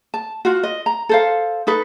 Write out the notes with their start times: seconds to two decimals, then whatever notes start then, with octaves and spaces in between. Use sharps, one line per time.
0.14 A5
0.45 F4 F#4
0.63 D#5
0.86 A#5
1.09 A4 C5 F5
1.67 D#4 A4 B4